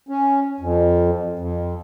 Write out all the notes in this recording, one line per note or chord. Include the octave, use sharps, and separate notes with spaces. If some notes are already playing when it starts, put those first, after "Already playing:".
C#4
F2
F2